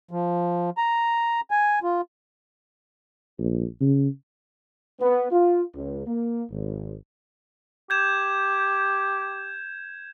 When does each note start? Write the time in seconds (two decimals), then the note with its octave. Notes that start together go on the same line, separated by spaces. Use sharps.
0.11 F3
0.78 A#5
1.51 G#5
1.83 F4
3.39 A#1
3.81 C#3
5.00 B3
5.31 F4
5.75 C#2
6.07 A#3
6.51 G#1
7.90 G4 G6 G#6 E7